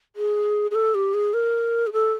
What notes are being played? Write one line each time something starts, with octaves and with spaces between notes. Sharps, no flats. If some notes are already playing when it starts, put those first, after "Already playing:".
G#4
G#4
A4
G4
G#4
A#4
G#4
A4